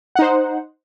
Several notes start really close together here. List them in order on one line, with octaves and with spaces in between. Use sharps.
F#5 D#4 C5